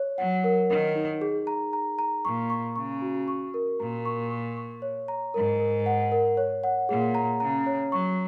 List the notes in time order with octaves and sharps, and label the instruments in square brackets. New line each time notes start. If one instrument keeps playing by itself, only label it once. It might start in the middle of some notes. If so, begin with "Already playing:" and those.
Already playing: [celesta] C#5
[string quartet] F#3 [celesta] F#5
[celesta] A#4
[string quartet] D#3 [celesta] A#4
[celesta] D#4
G#4
A#5
A#5
A#5
[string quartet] A#2 [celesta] C#6
[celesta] C#6
[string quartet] C#3 [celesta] C#6
[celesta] F#4
C#6
A#4
[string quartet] A#2 [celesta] A#5
[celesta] C#6
C#6
C#6
C#5
A#5
[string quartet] G#2 [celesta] A#4
[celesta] A#4
F#5
A#4
C#5
F#5
[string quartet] A#2 [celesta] G#4
[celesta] A#5
[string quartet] C#3 [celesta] A#5
[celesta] C#5
[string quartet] F#3 [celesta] C#6